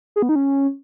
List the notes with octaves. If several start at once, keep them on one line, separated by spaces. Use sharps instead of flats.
G#4
B3
D#4
C#4